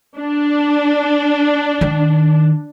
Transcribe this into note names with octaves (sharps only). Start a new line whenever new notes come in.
D4
D#3